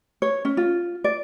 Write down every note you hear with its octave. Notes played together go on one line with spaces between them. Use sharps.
C#5
C#4
F4
D5